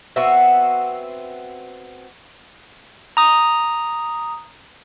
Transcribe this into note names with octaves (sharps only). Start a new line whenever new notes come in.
B3 C4 F#4 E5
A#5 D#6